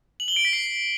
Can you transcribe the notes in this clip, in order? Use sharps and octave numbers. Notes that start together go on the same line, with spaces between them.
F#7
G7
D7
B6
C7